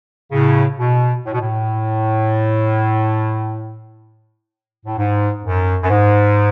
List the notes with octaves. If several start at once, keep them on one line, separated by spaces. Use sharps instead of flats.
A2 C#3
B2
A2
B2
A2
A2
G#2
F#2
F#2
G#2